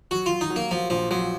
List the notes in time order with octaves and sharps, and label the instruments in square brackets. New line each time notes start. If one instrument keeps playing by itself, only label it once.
[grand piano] F#3 [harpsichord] F#4
[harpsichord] F4
[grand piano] F#3
[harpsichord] D#4
[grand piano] F#3
[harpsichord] A#3
[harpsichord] F3 [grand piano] F#3
[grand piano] A#1 [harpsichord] F3
[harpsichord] F3 [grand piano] F#3